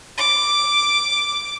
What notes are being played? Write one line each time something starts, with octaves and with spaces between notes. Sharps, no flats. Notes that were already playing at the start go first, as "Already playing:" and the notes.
D6